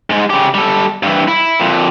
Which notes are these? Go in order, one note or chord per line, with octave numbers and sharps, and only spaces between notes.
G#2 G#3
C#3 G4
G3 A4
G2 E3
E4
F2 A#2